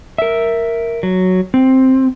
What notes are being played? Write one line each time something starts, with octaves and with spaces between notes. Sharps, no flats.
A#4 E5
F#3
C4